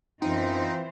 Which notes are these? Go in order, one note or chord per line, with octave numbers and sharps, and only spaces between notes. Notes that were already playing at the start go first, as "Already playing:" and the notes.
F#2 E3 C4 D#4 F4 C5